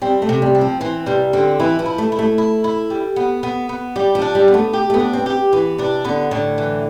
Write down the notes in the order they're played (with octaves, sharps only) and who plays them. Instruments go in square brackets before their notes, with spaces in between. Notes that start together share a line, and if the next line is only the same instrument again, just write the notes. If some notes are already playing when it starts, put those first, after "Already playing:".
[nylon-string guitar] G3 [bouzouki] C4
[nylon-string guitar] A3
[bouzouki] C3
[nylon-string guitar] G3
[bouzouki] C4
[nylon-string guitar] F3
[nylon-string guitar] E3 [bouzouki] C4
[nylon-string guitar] C3 [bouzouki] G3
[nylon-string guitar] D3 [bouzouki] C4
[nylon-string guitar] E3 [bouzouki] E4
[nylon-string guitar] F3
[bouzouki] E4
[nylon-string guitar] A3
[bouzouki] E4
[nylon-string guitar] A3
[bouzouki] E4
E4
G3
B3
B3
B3
[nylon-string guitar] G3 [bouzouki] G4
[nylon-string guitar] F3
[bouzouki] D4
[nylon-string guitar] G3
[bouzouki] B3
[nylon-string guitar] A3
[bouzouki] G4
[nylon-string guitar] A3
B3
[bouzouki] D4
[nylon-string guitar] C4
[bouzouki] G4
[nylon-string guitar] E3 [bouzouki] B3
[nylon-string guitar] C3 [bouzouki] D4
[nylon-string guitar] D3 [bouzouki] B3
[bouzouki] A2 [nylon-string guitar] D3
[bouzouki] E3